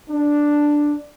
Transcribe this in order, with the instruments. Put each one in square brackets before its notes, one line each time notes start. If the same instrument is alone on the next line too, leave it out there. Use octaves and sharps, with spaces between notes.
[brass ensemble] D4